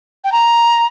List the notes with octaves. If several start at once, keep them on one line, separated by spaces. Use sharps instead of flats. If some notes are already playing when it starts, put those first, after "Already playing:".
G5
A#5